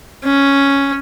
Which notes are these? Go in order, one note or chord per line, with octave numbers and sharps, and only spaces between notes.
C#4